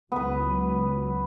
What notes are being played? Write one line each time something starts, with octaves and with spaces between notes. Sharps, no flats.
C#2 F#3 B3 B4